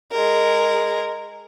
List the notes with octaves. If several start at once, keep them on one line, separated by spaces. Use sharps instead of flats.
G#3 A#4